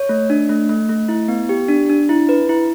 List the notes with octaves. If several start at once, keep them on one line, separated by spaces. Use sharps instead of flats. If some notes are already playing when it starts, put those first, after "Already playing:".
Already playing: C#5
A3
D4
A3
A3
A3
E4
B3
G4
D4
D4
E4
B4
E4